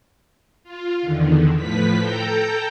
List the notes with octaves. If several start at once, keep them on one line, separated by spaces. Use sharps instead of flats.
F4
E2 D3 D#3
A2 F3 B4 B6
A4 G5 A#5 G6